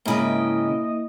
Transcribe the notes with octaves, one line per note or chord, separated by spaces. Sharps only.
G#2 C#3 A#3 E4 D#5 G5